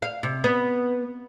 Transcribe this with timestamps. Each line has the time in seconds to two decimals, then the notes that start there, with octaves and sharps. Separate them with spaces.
0.02 F5
0.23 C3
0.44 B3